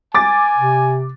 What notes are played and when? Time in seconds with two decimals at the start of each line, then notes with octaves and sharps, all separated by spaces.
0.14 G#5 D6 A6
0.55 C3